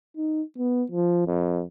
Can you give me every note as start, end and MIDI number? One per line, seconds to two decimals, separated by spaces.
0.17 0.42 63
0.58 0.84 59
0.92 1.26 53
1.27 1.63 41